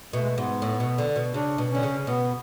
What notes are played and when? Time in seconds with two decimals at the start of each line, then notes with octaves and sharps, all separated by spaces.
0.13 B2 A3
0.21 G#3
0.28 A3
0.38 G#2 B3
0.62 A2
0.80 B2
0.98 D3
1.16 B2
1.34 C#3 D4
1.58 B2
1.71 D3 C#4
1.83 C#3
2.07 B2 B3